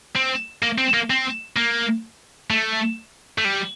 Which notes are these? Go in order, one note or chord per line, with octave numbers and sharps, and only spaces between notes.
C4
A#3
C4
A#3
C4
A#3
A3
A3
G3